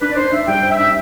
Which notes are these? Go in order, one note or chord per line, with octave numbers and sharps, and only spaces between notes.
D4 B4
D5
D4 C5
D4 E5
G3 G5
C5
E5
D4